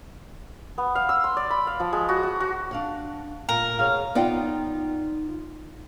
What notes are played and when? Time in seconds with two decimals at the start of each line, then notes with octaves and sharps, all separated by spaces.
0.78 B3
0.95 F5
1.09 E6
1.24 C6
1.37 D5
1.50 B5
1.67 F5
1.80 F3
1.93 G#3
2.09 F#4
2.23 F#4
2.40 F#4
2.71 D4 F5 F#5
3.49 A#2 A#4
3.78 B2 G#4 C#5 F5
4.15 B3 D#4 F4 D5 F5 G5